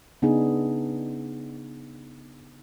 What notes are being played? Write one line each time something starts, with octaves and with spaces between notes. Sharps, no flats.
C#3 B3 D4 D#4 G#4